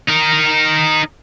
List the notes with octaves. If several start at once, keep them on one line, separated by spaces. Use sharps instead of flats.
D#4 A#4